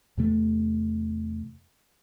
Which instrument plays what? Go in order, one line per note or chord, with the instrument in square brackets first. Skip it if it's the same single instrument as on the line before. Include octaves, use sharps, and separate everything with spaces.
[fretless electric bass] E2 C3 A3